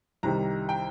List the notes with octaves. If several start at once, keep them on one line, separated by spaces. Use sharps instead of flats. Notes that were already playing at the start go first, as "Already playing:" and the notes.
C2 C3 D#3 G3 A#5
G5